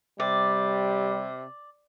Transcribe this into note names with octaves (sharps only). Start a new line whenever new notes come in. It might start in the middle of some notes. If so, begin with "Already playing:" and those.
C3 G3 D5